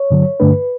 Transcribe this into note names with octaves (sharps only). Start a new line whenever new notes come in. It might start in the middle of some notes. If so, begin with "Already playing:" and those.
Already playing: C#5
G2 D3 F#3
G2 D3 A3 D4 B4